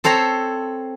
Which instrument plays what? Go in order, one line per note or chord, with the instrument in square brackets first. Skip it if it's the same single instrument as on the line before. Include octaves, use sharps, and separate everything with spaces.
[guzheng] C4 A4 C5 C#5 A#5